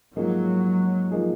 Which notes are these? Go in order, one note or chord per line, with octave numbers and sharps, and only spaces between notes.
G#2 F3 F#3 A#3 D#4 G#4
F3 A#3 D#4 G#4